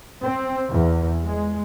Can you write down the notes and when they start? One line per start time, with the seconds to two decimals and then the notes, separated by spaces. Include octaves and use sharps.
0.22 C4
0.70 E2
1.24 G#3